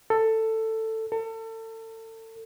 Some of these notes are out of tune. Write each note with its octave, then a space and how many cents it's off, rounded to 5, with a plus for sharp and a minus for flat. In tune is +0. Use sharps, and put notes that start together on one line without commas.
A4 +15
A4 +35